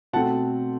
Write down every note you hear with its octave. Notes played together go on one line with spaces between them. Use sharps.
B2 A3 C4 F#5 A5